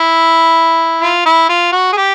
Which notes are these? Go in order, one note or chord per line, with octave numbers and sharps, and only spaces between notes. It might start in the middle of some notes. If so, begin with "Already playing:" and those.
Already playing: E4
F4
E4
F4
F#4
G#4
G4